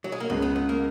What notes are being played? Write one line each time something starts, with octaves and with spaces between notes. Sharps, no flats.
F#3
G#3
A#3
C#2 C#3 G#3 B3
B3
B3
A#3